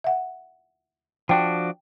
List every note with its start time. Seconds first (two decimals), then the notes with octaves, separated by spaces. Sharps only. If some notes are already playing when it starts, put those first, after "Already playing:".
0.04 E5 F#5
1.29 F3 D4 F#4 G5